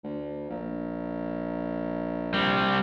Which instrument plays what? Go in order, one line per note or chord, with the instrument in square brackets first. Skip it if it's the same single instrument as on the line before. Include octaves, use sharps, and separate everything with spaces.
[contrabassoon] D2
A#1
[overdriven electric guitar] G3 C4